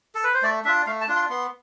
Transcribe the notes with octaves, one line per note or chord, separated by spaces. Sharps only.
A4
B4
C5
A3 D5
D4 F4 E5
A3 F5
A5
D4 F4
C6
B3 C6